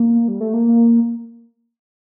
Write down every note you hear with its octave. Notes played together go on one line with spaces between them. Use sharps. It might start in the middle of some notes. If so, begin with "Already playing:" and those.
Already playing: A#3
G3
A3
A#3